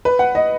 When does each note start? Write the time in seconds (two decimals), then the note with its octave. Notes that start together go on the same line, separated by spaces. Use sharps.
0.05 B4
0.19 F#5
0.35 D#5